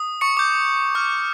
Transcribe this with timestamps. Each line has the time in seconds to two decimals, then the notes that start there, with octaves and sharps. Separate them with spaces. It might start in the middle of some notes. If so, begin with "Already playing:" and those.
Already playing: D#6
0.21 C#6 C#7
0.37 D6 G6
0.95 C#6 F6